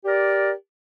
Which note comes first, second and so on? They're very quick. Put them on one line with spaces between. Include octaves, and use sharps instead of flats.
G4 D5 A#4